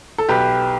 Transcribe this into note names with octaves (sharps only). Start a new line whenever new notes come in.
A4
B1 G4 B4